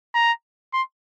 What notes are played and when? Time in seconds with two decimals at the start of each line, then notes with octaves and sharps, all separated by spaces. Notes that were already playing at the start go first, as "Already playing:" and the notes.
0.14 A#5
0.73 C6